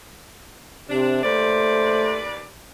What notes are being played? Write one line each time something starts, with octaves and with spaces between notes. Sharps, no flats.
C3 D4
D#2 A3 B4 C5 D5